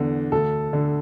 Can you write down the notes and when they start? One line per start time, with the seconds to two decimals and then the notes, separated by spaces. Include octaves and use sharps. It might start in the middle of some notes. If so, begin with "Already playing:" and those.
Already playing: E2 D3
0.32 D2 A4
0.73 D3